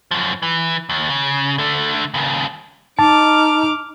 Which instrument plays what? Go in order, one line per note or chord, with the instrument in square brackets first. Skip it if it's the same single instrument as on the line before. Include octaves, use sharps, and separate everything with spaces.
[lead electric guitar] F#2 F3
E3
D#2
C#3
D3 A3
D#2 C#3
[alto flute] D#4 [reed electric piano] A5 [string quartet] D6 F6